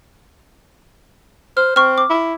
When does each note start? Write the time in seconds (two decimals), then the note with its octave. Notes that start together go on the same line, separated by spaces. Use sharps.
1.57 C5 F6
1.76 C4 C#6 F6
1.98 D6
2.10 E4